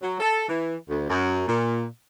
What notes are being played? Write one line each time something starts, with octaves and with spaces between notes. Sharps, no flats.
F#3
A4
E3
D2
F#2
A#2